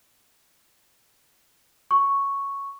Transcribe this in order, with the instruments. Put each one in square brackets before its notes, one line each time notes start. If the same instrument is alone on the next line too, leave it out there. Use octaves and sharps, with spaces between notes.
[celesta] C#6